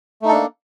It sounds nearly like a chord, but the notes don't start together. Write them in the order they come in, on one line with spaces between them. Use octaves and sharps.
A3 D#4 A4 D4 A#3